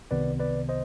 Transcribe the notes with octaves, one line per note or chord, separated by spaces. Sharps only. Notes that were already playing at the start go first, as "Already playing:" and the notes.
C2 C3 D#3 B3 B4 D5
B4 D5
C5 D#5